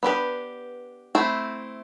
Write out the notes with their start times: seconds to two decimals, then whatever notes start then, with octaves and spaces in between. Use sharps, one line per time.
0.03 B3 D4 G4 B4
1.15 A3 C4 E4